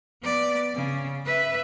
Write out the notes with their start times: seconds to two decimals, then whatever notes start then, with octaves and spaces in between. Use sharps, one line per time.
0.22 B3 D5
0.75 C#3
1.26 B4 E5